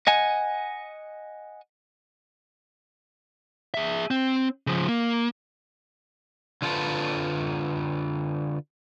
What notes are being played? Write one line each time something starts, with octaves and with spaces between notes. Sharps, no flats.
D#5 F#5 G#5
G#4 E5
C4
C#3 F3
A#3
D3 F4 G#4 A4 B4